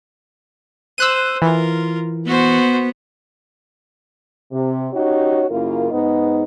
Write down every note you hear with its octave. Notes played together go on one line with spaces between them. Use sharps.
C5 E6 F#6 D#7
E3 F4 A#4
B3 F#4 C5
C3
C#4 D#4 F#4 G4 C#5
F#2 C#3 A#3 E4 F4 A#4
G#2 B3 D#4